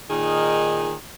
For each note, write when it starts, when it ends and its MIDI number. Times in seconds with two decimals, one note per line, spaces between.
0.10 0.94 46
0.10 0.94 51
0.10 0.94 63
0.10 0.94 68